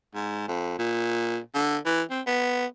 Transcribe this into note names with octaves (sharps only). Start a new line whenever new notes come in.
G#2
F2
A#2
D3
E3
C4
B3